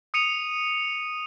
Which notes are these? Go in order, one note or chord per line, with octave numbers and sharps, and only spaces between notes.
D#6 C#7 D#7 F7